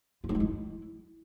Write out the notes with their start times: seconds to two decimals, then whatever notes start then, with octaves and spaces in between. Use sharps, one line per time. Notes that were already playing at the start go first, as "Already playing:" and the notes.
0.24 F4
0.29 D#4
0.35 G#3
0.40 E4